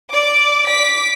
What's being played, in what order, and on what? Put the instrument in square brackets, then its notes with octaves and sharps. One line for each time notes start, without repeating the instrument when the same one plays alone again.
[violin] D5 D6
D6 B6